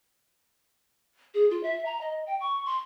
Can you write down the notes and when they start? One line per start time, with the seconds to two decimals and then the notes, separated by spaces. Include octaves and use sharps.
1.34 G#4
1.50 F4
1.63 E5
1.85 A#5
2.01 D#5
2.27 G5
2.40 C#6
2.65 C6